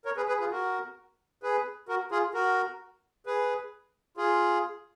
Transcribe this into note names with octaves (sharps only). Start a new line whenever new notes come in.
A#4 C#5
G#4 B4
G#4 B4
F4 G#4
F#4 A#4
G#4 B4
F#4 A#4
F4 G#4
F#4 A#4
G#4 B4
F4 G#4